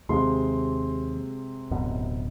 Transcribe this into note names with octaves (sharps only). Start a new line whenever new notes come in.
D#2 C3 G#3 C6
D1 F#2 B2